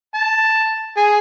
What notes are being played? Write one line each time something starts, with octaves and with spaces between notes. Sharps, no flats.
A5
G#4